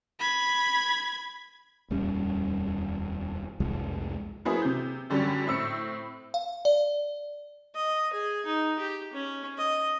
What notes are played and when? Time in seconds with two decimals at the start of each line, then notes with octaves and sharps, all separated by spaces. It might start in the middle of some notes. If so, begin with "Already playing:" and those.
0.20 B5 G#6
1.90 D#1 F2 G3 C#4
3.60 C2 F2 F3 G#3
4.45 F#3 A#3 B3 E4 G#4 C5
4.62 C3 G6
5.10 F#2 D3 F#3 G3 C#4
5.47 A2 C4 E6 C#7
6.34 F5
6.65 D5
7.75 D#5
8.13 G#4
8.46 D#4
8.79 G4
9.13 C#4
9.57 D#5